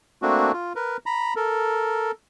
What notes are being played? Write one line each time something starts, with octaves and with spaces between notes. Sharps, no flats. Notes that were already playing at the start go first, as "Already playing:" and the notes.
A3 A#3 C4 D4 F#4
F4
A#4 B4
A#5 B5
A4 A#4